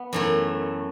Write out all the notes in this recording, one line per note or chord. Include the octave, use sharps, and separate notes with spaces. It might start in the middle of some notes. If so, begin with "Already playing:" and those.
Already playing: B3
F#2 E3 A3